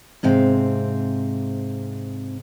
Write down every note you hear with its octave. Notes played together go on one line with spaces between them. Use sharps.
G#2 C3 C4 F5